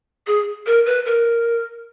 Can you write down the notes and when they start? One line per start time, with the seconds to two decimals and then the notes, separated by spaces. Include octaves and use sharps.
0.27 G#4
0.66 A#4
0.86 B4
1.06 A#4